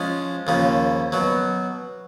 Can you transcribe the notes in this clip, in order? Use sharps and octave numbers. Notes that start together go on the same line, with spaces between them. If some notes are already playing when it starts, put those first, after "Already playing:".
Already playing: F3 G#3 C#4
D#2 C#3 F3
B2 F#3